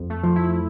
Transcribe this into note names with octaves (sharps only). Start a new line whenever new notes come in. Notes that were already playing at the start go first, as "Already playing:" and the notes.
Already playing: F2
A3
F3
E4